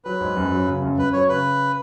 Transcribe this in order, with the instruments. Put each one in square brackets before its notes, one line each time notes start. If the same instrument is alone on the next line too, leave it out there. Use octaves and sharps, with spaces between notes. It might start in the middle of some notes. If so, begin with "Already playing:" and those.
[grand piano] F#3 [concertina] B4
[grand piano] G#2
F#2
F#3
C#3
F#2
[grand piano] F#2 [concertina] B4
[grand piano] F#3 [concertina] C#5
[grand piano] C#3 [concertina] B4